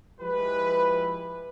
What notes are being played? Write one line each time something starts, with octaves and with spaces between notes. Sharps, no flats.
F3 G#3 E4 G4 B4